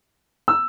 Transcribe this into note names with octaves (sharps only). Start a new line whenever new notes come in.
E6